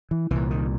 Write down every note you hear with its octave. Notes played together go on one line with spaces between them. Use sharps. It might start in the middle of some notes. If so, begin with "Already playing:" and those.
E3
C2 A#2 E3
D#3